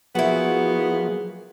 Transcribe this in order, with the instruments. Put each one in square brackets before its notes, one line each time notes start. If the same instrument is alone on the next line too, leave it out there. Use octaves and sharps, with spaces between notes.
[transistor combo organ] F3 F#3 A#3 [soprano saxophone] B3 [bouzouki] E4 F#4 [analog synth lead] G#4